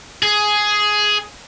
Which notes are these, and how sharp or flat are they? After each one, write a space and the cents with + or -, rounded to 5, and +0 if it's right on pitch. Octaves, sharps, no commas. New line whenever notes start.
G#4 +10